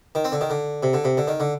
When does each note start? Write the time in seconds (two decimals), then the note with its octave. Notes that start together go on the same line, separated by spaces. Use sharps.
0.15 D#3
0.25 C4
0.32 D3
0.41 D#3
0.50 D3
0.83 C3
0.93 D3
1.04 C3
1.17 D3
1.27 D#3
1.40 D3